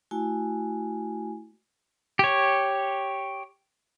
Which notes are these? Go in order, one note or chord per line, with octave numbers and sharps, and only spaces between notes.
A3 E4 F#4 G#5
G4 C#5